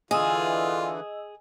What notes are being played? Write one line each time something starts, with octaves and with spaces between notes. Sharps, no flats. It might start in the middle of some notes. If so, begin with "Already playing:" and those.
D3 E3 F4 G#4 D#5 D#6 E6